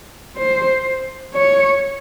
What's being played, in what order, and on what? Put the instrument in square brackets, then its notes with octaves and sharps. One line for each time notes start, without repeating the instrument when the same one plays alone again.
[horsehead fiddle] C5
C#5